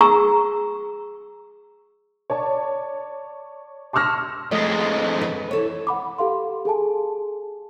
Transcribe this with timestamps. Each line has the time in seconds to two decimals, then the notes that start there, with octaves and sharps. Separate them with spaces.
0.01 G#4 A#5 C#6 E6
2.30 C#5 D5 A5
3.93 A5 C6 C#6 E6 F6 A#6
4.51 F2 G#3 A3 D#5
5.21 B4
5.51 E3 A4 C#5
5.87 F#5 B5 D6
6.18 G4 A4 F5 C6
6.65 G#4 A4 G#5 A5